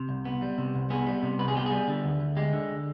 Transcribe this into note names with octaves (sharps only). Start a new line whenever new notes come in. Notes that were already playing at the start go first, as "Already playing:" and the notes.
Already playing: C3
C2
B3
G3
C3
C2
B3 G#4
G3
C3
C2 B4
G#4
B3 G4
G3 G#4
D3
D2
D2
G#3 G4
D3